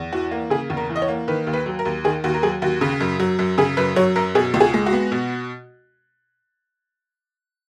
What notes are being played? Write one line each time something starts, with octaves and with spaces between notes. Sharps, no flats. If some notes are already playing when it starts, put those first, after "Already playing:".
Already playing: E2
E3 F#4
A#3
C#3 G#4
E2
A#4
E3
D#5
C#5
A#3
D#3 B4
D#2
B4
F#3
A#4
D#2
D#3 G#4
D#2 F#4
A#4
F#3 G#4
D#2 F#4
C#3
F#2
F#3
F#2
C#3 G#4
F#2 B4
F#3 C#5
F#2 A#4
B2 G#4
C#2
G#4
G#3
F#4
B3
B2